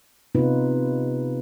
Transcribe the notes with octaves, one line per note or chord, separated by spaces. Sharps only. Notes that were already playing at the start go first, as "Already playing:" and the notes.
C3 B3 D#4 F4 B4